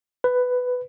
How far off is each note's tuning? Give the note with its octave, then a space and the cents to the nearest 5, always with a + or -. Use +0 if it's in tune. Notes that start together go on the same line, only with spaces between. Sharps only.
B4 +10